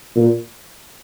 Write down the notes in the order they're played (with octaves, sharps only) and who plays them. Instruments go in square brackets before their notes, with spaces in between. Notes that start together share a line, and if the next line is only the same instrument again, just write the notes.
[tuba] A#2